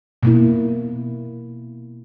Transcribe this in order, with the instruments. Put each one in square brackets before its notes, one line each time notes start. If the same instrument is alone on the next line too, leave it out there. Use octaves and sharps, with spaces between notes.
[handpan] B2 A#3 E4